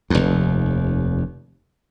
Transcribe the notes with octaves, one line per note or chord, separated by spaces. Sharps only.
F1 D#2